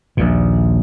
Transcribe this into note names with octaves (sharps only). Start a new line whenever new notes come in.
A#1 D#2 A#2